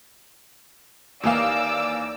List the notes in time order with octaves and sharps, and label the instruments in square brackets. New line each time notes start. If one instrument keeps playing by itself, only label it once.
[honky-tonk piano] D#2 E3 F5 [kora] A#3 D#4 [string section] D5 D6 E6